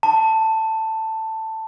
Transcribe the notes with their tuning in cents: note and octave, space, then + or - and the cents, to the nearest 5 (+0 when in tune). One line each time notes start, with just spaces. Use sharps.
A5 +10